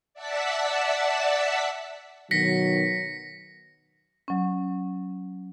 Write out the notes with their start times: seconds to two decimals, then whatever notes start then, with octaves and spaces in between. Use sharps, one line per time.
0.14 D5 E5 F#5 A5 E6 B6
2.31 B2 D#3 F#3 A#6 B6 C#7
4.28 F#3 C#4